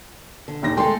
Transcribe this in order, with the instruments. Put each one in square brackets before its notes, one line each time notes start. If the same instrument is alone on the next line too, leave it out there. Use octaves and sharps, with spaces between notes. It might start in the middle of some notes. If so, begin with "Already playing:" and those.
[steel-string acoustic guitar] D3
[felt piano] D#1 D#2 A#6
[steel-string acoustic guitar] G#3 A3 A4 [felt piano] G5 C6